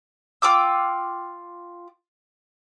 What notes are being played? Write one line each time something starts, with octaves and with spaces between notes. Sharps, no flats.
F4 G5 D6 E6